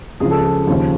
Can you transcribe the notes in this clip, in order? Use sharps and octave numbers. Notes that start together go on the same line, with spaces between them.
C#2 C#3 F3 G#4
A4
G#4
D#2 C#3 F3